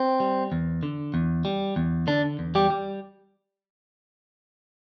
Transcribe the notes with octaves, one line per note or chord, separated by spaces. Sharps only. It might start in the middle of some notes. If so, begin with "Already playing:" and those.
Already playing: C4
G3
E2
D3
E2
G3
E2
D3 D4
E2
G3 G4
G3